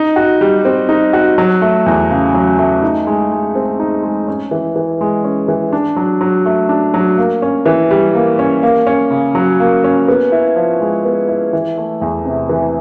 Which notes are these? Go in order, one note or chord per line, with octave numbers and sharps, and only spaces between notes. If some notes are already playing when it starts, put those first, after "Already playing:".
Already playing: D#4
F#4
G3
C4
D#4
F#4
F#3
A3
E2
C#3
F#3
A3
D#4
G#3
G#3
C4
D#4
G#3
C#4
E3
E3
G#3
C#4
E3
D4
F#3
F#3
A3
D4
F#3
A#3
C#4
E3
G3
A#3
C#4
A#3
C#4
C#3
F#3
A#3
C#4
B3
E4
F3
G#3
B3
E4
E3
A3
E2
C3
E3